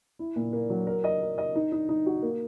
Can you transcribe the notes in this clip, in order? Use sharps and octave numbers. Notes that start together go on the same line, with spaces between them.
E4
A#2
A#3
F#3
A#4
D#5
A#4
D#5
D#4
D#4
D#4
F#4
A#3